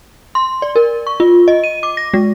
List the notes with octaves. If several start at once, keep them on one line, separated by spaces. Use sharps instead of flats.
C6
D5
A#4
C#6
F4
D#5
D#7
D6
A#6
G#3